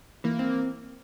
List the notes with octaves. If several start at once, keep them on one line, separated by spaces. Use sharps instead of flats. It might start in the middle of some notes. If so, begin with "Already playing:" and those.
E3 A#3
C4